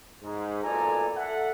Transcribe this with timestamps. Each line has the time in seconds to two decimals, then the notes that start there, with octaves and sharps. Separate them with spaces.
0.23 G#2
0.64 B1 A#2 A4 D5 G#5 A#5
1.17 A4 E5 F#5